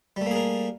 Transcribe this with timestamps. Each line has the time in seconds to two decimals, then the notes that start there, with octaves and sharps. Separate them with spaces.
0.16 G3
0.21 A3
0.26 A#3
0.31 G#4
0.36 A#4